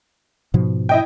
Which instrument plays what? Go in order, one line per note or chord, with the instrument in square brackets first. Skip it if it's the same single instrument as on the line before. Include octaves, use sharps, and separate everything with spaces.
[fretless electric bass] G#2 B2 F3
[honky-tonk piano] E4 D#5 G5